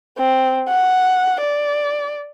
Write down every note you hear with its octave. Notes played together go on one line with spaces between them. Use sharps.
C4
F#5
D5